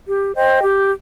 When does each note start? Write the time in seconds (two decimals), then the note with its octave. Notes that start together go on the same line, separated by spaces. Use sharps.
0.07 G4
0.35 C5 D#5 G5
0.62 G4